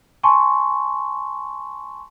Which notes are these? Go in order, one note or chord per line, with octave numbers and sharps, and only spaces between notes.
G#5 A5 C6 C#6